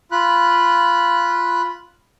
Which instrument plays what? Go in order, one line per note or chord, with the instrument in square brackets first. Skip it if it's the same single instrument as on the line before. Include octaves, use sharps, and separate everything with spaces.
[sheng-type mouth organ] F4 B5 F#6